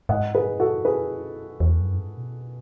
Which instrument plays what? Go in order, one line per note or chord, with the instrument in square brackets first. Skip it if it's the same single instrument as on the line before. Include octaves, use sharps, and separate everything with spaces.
[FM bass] G#2 [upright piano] D#5 F#5
[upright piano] G#4 B4
F#4 A4
G#4 B4
[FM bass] E2
F#2
G#2
B2